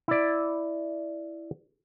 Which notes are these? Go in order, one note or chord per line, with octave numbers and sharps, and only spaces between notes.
E4 D5